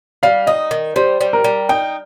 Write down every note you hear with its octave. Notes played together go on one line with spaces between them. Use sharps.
G3 F5
D#4 D#5
D#3
G3 C5
G3
A#4
G3
D#4 G5